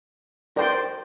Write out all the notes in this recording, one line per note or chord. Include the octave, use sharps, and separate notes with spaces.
A#4 C5 D5 G5 C6